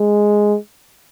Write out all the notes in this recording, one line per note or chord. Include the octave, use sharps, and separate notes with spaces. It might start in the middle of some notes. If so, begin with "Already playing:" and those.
Already playing: G#3